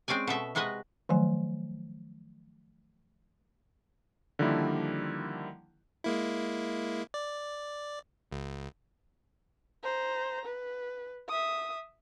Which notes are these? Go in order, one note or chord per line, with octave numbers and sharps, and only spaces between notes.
G#3 C4 C#4 D5 G#5
B2 A4 E5
C3 G#3 F#4 B4 D#5
D#3 F3 F#3 A3 G#5
D3 D#3 F3 G3 A#3 E4
G#3 A#3 E4
D5
C#2
C5 A#5
B4
E5 D#6